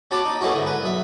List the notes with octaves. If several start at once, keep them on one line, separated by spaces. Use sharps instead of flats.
C#4 F#4 A5 B5 D6
D#4
A3 B3 C#4 E4 F#4
G#2 D3
B4
B1 E5